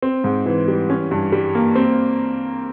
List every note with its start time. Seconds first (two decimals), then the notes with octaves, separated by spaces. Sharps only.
0.02 C4
0.24 G#2
0.46 E3
0.68 G3
0.90 C#4
1.11 G2
1.32 G3
1.55 A#3
1.75 C4